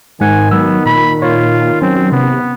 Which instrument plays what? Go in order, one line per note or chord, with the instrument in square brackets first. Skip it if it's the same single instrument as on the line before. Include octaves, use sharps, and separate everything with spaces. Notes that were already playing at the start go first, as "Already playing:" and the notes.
[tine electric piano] G#2 F#5 [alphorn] D#3 [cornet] G#5
[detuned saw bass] F#3 [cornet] B3 [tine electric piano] E6
[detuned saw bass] A#2 [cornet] B5
[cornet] F4 [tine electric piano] C#5
[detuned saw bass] F#3 [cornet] C4 [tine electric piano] C#4
[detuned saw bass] C3 [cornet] B3